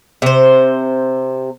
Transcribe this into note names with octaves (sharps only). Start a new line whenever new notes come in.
C3 C5